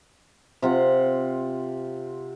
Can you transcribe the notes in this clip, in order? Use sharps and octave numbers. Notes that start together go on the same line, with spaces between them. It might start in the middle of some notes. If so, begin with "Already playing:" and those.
C3 F4 F#5